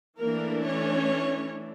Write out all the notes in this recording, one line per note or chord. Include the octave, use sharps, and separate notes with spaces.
E3 A3 A#3 D4 A#4
C#4 C#5